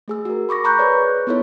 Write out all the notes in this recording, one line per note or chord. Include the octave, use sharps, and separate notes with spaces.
A3 G#4 E6
F#4 A#4
B5 C#6 D6 A#6
A#5 B5 C#6 F#6 G6
G#4 B4 C#5 D5
B3 D#4 E4 A4 C#5